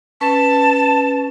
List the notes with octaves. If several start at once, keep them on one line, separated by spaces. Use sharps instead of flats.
C#4 B4 A5